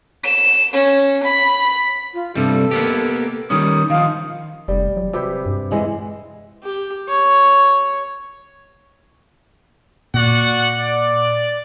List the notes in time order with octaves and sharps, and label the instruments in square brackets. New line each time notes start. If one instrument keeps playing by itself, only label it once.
[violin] E7
C#4
B5
[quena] F4
[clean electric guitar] G2 C3 G3 [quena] A4
[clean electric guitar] A#3 B3 G4
[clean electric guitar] D#3 G3 C#4 [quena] D#6
[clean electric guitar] D#3 F3 [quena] F5
[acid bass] F1 [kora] G3
[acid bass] F#3
[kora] C3 G4 B4 [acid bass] F#4
[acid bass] G2
[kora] E3 G#3 F#5
[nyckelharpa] G4
C#5
[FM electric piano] A#2 [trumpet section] F#4 D5 F#5
[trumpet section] D5